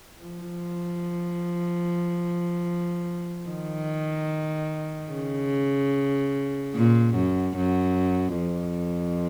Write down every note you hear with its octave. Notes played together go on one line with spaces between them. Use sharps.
F3
D#3
C#3
A#2
F#2
F#2
F2